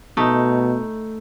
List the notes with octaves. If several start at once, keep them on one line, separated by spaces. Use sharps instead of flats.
B2 A3 D#4